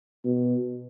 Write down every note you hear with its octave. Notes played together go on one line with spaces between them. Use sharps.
B2